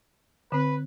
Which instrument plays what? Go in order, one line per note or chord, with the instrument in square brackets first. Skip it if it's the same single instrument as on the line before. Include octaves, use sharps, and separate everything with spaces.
[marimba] D3 C4 [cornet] B4